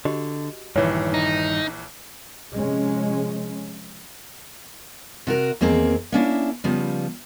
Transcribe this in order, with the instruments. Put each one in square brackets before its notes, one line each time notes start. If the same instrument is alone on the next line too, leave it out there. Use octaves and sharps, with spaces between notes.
[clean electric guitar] D3 [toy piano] F#4 G4 D#5
[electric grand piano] A#1 E3 [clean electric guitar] G2 D#3 [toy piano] C#5
[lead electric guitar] D#4
[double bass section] C3 F3 G#3 C#4
[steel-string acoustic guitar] C3 F#4 A#4
E2 D#3 A#3 C4 G#4
A#3 C#4 D4 E4
C#3 F3 G3 B3